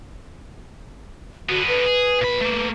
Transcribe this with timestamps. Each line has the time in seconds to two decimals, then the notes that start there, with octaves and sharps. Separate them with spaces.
1.49 D3 B3 F#4
1.68 B4
1.86 G#4
2.21 A#2 B5
2.41 A3 A#3